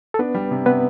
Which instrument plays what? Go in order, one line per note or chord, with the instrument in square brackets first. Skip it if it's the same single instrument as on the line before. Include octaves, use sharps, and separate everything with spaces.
[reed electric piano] A4
[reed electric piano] B3 B4 [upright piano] D4
[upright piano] G3
C3
[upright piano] C3 [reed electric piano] B3 B4